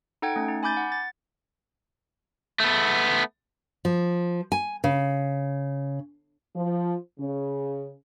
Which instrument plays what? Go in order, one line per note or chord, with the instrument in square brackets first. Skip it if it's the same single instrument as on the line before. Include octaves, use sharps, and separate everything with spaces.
[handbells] D#4 A4 F#5 G5 G#6
A3 C#4
D#4
G#5 B5 D6 G6 A6
F#5
A6
[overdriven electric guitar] A3 B3
[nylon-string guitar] F3
G#5
C#3
[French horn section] F3
C#3